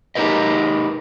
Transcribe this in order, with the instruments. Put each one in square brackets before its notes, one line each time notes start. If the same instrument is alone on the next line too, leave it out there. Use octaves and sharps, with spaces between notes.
[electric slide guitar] D#4 G4 A#4 B4 D#5